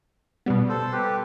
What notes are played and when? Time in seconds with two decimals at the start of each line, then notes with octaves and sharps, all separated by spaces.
0.46 B2 G3 B3
0.69 A4 C5
0.92 G4 B4